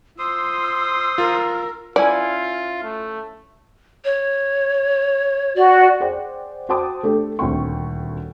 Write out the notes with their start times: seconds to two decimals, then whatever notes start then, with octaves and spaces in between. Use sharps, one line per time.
0.19 F4 C5 C6 D#6 E6
1.18 F4 A#4
1.96 C#4 E4 F4 D5 G#5
2.84 A3
4.05 C#5
5.56 F#4 D5
6.00 G#4 C5 D5 F#5 G5
6.69 F#4 C5 G5 A5 D6 D#6
7.03 A3 D4 G4 A4
7.39 D#1 D2 C4 G5 C#6